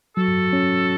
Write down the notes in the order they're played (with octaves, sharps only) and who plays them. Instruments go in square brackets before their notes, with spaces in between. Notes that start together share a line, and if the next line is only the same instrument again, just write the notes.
[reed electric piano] F#3 [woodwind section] F#4 A4
[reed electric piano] C#4